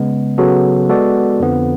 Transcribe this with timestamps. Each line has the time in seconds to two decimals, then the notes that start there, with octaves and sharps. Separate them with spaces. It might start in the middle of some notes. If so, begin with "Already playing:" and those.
Already playing: C#3 G#3 B3
0.38 C#3 F#3 B3 F#4 A4
0.89 G#3 B3 F#4 A4 D5
1.40 F2 D3 F3 B3